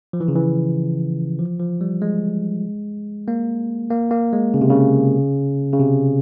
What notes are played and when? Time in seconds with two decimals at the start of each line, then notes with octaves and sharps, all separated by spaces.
0.13 F3
0.20 E3
0.28 C#3
0.36 E3
1.39 F3
1.60 F3
1.81 G3
2.02 G#3
3.28 A#3
3.90 A#3
4.11 A#3
4.33 G#3
4.54 C#3
4.61 C3
4.69 C#3
5.73 C#3
5.79 C3